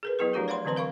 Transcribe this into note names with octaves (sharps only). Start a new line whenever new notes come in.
G#4 A#4 B4
F#3 B3 E4 G#4 B4
F3 A3 D4 F#4 G4 A#4
C5 D5 F5 F#5 B5 C6
D3 E3 F#3 C4 C5 C6
A#4 F5 B5 C#6